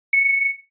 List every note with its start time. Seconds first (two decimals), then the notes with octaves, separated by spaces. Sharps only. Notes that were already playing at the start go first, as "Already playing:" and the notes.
0.13 C#7